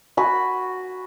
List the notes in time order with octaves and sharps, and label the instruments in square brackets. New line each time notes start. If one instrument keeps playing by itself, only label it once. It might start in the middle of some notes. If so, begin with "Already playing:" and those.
[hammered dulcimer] F#4 G#5 B5